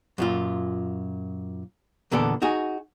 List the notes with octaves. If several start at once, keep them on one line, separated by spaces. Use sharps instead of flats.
F#2 A#2 F4
E2 A#2 D3 B3 A4 D5
D#4 F#4 G#4